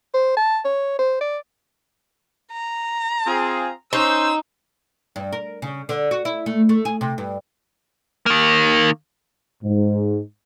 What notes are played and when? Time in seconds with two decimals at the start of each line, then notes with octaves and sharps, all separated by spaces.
0.14 C5
0.37 A5
0.65 C#5
0.99 C5
1.21 D5
2.52 A#5
3.27 C4 F4 G#4
3.93 C#4 D#4 C5 E6
5.16 G2
5.32 A#4
5.62 C#3
5.89 D3
6.11 F#4
6.25 E4
6.46 A3
6.69 A3
6.85 G#4
7.01 C3
7.18 G2
8.26 D#3 A#3
9.64 G#2